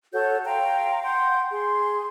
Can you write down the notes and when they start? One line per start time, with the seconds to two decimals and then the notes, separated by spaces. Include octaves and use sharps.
0.13 F#4 A4 C#5 G6
0.46 F5 G5 A#5 C6
1.02 F#5 G5 C6 G6
1.52 G#4 C6